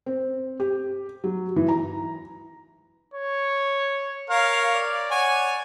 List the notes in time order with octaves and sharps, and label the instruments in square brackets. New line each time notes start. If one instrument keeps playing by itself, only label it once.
[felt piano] C4
G4
F#3
E3
A#5
[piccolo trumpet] C#5
[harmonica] A#4 C#5 [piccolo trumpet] F5
[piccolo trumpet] D5
[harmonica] C#5 F#5 G#5